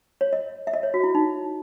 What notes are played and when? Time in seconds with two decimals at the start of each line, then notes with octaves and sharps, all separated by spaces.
0.21 C#5
0.33 D#5
0.67 E5
0.73 D#5
0.83 C#5
0.94 F#4
1.03 E4
1.15 D#4